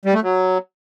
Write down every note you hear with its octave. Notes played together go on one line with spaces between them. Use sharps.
G3
A3
F#3